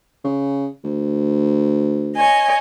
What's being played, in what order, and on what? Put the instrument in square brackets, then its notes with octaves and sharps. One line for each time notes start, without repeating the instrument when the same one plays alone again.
[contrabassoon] C#3
D2
[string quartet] C#5 D#5 G#5